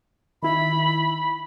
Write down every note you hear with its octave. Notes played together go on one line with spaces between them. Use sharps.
D#3 E4 B5